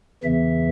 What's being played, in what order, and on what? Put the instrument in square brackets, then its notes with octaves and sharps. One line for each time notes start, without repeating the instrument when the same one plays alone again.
[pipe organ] E2 C#3 E3 E5